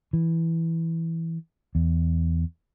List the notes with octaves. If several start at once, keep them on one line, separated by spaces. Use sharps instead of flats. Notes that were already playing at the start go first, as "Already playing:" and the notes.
E3
E2